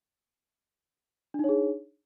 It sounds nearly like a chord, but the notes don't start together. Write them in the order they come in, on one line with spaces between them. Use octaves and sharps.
D4 D#4 C#5 G#4